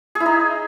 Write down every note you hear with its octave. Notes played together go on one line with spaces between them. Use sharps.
G#4
E4
D#4